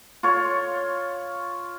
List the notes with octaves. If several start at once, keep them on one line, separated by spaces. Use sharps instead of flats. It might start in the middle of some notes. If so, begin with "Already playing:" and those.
F4 C#5